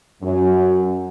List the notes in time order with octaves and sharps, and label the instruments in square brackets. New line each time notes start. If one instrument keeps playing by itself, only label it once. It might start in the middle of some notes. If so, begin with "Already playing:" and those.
[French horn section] F#2